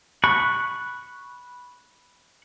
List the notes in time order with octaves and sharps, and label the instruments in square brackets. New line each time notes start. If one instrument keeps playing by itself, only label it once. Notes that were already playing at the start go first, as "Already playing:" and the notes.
[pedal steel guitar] B5 C#6 F#6